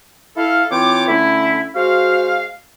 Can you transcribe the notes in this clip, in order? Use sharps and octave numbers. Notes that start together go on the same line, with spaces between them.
E4 A4 F5
E3 C4 F4 C#5 G5 D6
D3 A3 C#4 E4
G#3 F#4 C5 F5